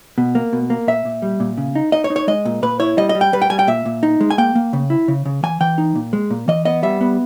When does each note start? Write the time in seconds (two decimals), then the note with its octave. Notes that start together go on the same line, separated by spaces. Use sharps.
0.18 B2
0.35 A#3
0.53 B2
0.70 A#3
0.88 A#2 E5
1.05 A#2
1.22 G3
1.40 A#2
1.58 C#3
1.75 D#4
1.92 D#4 D#5
2.04 C#5
2.10 D#4
2.16 C#5
2.28 G#3 D#5
2.45 A#2
2.63 A#2 B4
2.80 E4 C#5
2.97 G3 D#5
3.09 D#5
3.15 G3
3.21 G5
3.33 G3 B4
3.42 G5
3.50 G3 G#5
3.59 G5
3.68 A#2 E5
3.86 A#2
4.03 D#4
4.21 G#3
4.30 G#5
4.38 A#3 G5
4.55 A#3
4.73 C#3
4.90 E4
5.08 C#3
5.26 C#3
5.43 E3 G#5
5.61 E3 G5
5.78 D#4
5.95 A#2
6.13 G#3
6.31 A#2
6.48 E3 D#5
6.65 B3 D#5
6.83 G3 E5
7.01 B3